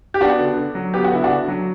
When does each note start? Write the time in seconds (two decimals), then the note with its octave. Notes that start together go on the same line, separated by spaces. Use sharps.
0.14 G4
0.21 B3 D4 F#4
0.39 D3
0.57 D3
0.75 F#3
0.94 B3 G4
1.05 F#4
1.11 D3 E4
1.24 D4 F#4
1.29 D3
1.48 F#3